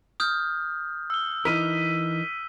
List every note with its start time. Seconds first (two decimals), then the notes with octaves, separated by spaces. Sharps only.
0.20 D#6 F6 G6
1.10 E6 G7
1.45 E3 D#4 A#4 B6 D#7